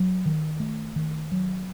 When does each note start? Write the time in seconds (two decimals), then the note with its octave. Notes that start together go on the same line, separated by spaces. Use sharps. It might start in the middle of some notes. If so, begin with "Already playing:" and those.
Already playing: F#3
0.26 D#3
0.60 A3
0.96 D#3
1.32 F#3